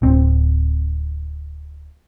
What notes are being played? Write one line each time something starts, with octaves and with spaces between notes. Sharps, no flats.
D1 C4